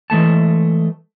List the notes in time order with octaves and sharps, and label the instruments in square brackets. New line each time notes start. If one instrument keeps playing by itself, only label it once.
[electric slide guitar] E3 G#3 A3 A5